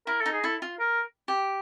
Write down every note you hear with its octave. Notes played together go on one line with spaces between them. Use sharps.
E4 A#4
A4
D#4
G#4
E4 A4
F4
A#4
G4